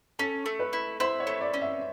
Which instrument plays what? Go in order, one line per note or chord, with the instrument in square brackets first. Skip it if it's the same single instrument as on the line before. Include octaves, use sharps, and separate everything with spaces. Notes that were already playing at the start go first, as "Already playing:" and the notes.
[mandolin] C#4 [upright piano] A4
[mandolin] A3
[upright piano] B4
[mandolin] E4
[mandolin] E4 [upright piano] C5
[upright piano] C#5
[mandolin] A3
[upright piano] D5
[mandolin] C#4
[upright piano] E5